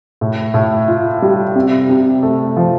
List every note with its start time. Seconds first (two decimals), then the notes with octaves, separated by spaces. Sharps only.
0.21 A2
0.54 A2
0.88 F4
1.22 G3
1.55 C3
1.90 C3
2.23 A3
2.57 F3